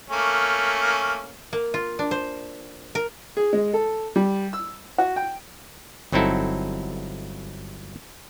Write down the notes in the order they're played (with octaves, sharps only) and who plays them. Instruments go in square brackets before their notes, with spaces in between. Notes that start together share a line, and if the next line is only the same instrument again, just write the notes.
[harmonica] A3 A#3 C#4
[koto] A#3
F4
D4
C5
A#4
[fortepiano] G#4
G#3
A4
G3
E6
F#4
G5
[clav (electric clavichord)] G1 F#3 C4 D#4 E4 A4